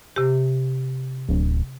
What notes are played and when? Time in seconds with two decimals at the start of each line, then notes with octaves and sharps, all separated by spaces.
0.16 C3 G4
1.29 D1